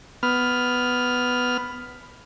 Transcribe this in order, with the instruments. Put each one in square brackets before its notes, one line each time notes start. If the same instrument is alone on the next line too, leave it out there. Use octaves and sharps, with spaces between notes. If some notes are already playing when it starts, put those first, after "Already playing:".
[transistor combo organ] B3 F6